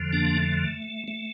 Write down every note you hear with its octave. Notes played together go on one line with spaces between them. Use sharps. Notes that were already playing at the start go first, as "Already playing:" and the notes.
Already playing: F2 D3 F3
A#3 D4
A3
A3